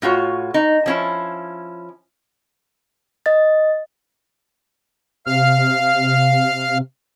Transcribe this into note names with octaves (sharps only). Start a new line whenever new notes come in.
A2 F4 F#4 C#5
D#4
F3 C#4 E4
D#5 A6
C3 F5 F6